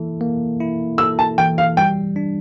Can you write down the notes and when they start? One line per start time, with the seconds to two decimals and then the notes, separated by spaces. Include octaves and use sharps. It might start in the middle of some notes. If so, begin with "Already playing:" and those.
Already playing: E3 A#3 E4 A4
0.21 A#3
0.60 E4
0.98 A4 E6
1.19 A5
1.38 E3 G5
1.58 F5
1.77 G3 G5
2.16 D4